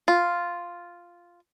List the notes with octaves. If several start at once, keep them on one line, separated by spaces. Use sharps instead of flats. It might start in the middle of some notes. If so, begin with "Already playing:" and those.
F4